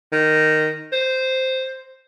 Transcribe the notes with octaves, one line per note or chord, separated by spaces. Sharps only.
D#3
C5